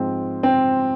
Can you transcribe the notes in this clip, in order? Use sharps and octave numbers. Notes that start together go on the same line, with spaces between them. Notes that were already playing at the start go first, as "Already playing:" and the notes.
Already playing: G#2 F3 C4
C4